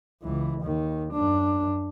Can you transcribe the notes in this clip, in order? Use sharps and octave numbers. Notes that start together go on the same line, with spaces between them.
C#2 E3
D#2 D#3
F#2 D4